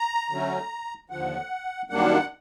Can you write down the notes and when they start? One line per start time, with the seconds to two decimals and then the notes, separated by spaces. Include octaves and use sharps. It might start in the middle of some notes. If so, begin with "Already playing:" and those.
Already playing: A#5
0.30 D3 F#3 A3 C#4
1.10 D#2 D3 F3 F#5
1.89 F#2 D#3 G3 A#3 D4 F#5